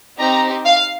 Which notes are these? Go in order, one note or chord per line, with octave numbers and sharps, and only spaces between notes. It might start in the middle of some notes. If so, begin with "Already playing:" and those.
C4 D#4 G4 A#5
F5